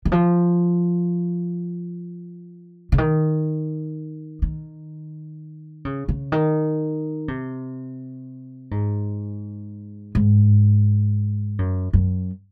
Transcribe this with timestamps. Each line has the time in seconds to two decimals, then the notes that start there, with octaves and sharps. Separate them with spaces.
0.05 D#3
0.12 F3
2.92 C#3
2.98 D#3
4.42 D#3
5.85 C#3
6.08 C#3
6.32 D#3
7.28 C3
8.71 G#2
10.15 G#2
11.59 F#2
11.93 F#2